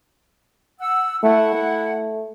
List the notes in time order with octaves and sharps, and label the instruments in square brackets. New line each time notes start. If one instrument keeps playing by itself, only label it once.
[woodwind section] F#5 E6
[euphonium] A3 [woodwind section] E4 F#5
[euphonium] A3